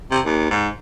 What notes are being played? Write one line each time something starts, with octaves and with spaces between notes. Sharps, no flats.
C3
D#2
G#2